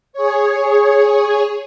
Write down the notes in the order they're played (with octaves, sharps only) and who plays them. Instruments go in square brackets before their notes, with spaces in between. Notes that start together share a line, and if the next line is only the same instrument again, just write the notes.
[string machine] G#4 C#5